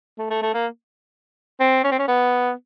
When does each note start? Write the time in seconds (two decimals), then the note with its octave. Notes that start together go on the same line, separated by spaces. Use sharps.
0.19 A3
0.30 A3
0.42 A3
0.54 A#3
1.60 C4
1.84 C#4
1.91 C4
1.99 C#4
2.08 B3